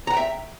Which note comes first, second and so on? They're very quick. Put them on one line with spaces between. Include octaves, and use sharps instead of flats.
A#5 F#5 G5 E5